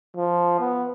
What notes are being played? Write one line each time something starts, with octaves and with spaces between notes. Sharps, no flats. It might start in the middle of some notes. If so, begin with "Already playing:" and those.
F3
B3